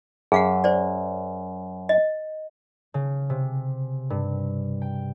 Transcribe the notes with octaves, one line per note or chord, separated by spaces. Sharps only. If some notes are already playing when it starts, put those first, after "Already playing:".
F#2 G#4 F5 F#5
C5 D5
D#5
C#3
C3
G2
G5